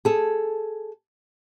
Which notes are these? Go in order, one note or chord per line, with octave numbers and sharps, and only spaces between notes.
G#4 A4